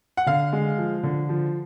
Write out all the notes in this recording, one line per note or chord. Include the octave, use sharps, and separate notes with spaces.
F#5
D3 F5
G#3
F3
D3
F3